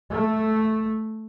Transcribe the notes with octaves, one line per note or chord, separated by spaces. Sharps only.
A3